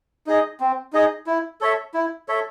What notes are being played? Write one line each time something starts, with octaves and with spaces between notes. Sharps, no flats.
D#4 G#4 D#5
C4
D#4 G#4 D#5
E4
A4 C#5 E5
E4
A4 C#5 E5